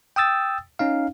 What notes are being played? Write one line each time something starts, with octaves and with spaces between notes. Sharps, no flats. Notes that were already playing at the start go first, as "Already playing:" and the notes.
G5 D#6 E6 A6
C#4 D#4 F5